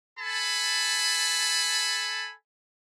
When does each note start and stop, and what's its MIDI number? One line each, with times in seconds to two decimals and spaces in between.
0.19 2.34 69
0.19 2.34 80
0.19 2.34 81
0.19 2.34 83